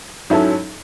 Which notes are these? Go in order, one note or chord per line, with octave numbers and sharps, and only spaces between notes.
G#2 F#3 C#4 E4 A4